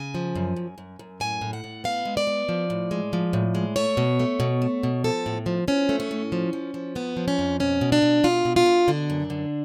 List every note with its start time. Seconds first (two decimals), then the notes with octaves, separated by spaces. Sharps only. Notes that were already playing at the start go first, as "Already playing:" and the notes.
Already playing: C#3 G#5
0.15 F3
0.36 F#2
0.56 F#2
0.78 F#2
0.99 F#2
1.20 A2 G#5
1.41 A2
1.53 F#5
1.64 A2
1.84 B3 F5
2.05 G#3
2.17 D5
2.27 B3
2.49 F3
2.70 A2
2.91 G#3
3.13 F3
3.33 A2
3.55 G#3
3.76 A3 C#5
3.97 B2
4.19 A3
4.40 B2
4.62 A3
4.83 B2
5.04 F3 A4
5.26 A2
5.46 F3
5.68 F3 C#4
5.89 A3
6.00 C#4
6.11 A2
6.32 F3
6.53 F3
6.74 F3
6.95 F2 B3
7.17 F3
7.28 C#4
7.39 F2
7.60 B2 C#4
7.81 B2
7.92 D4
8.02 B2
8.24 B2 F4
8.45 B2
8.56 F4
8.66 B2
8.88 D3 D4
9.10 F#2
9.30 D3